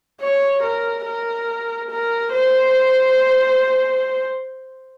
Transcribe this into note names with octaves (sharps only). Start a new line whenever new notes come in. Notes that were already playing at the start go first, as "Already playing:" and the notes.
C#5
A#4
A#4
A#4
C5